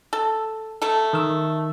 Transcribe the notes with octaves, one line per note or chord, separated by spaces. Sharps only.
A4
A3 A4
D#3 E6